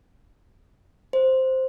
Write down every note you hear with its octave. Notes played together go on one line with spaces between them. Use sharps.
C5